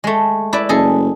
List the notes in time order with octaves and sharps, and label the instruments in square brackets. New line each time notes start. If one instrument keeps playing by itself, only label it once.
[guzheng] G#3 A3
E4 B4 D5
[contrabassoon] F#1 [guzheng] G#4 A4 D#5